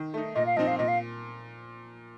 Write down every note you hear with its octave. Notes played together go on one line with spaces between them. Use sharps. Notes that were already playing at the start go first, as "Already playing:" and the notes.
Already playing: D#3
A3 D#4
A#2 D#5
F5
F3 C4 D#4 D#5
F5
A#2 D#5
F5